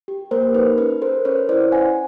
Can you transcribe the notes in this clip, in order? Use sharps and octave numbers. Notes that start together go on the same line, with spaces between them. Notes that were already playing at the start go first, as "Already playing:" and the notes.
G4
A#3 A#4 C5
D#4 B4
C#4 B4
A4 A#4 C5
C#4 B4 C#5
E4 C5 D5
C#4 F#5 G#5